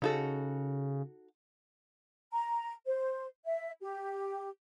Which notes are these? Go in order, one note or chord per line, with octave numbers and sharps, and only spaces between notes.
C#3 D#4 F#4 A4
A#5
C5
E5
G4